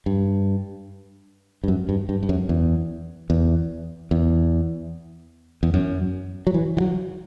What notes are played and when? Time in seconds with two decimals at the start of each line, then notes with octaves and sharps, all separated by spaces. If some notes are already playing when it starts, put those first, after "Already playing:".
0.06 G2
1.64 G2
1.68 F#2
1.89 G2
2.09 G2
2.23 G2
2.29 F#2
2.49 E2
3.30 E2
4.11 E2
5.63 E2
5.74 F#2
6.47 F#3
6.54 E3
6.77 E3
6.80 F#3